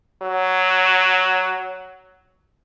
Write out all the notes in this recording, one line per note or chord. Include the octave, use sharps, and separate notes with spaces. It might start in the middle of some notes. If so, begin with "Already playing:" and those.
F#3